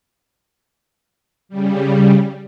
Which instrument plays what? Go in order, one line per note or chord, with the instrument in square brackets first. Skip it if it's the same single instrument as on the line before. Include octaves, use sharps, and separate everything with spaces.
[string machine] C#3 G3